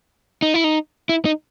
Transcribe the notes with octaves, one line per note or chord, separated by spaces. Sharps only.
D#4
E4
D#4
E4
D#4